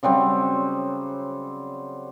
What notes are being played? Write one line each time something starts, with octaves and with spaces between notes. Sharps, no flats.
C#3 F#3 G3 C4